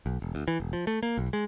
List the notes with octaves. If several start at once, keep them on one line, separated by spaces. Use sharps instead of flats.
B1
E1
D2
E3
E1
F3
A3
A#3
B1
G#3